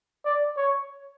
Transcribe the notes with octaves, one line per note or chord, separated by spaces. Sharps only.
D5
C#5